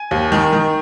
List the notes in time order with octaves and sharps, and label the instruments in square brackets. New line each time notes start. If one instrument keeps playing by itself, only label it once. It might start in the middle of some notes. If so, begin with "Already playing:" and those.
Already playing: [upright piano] G#5
D#2
D#3
D#3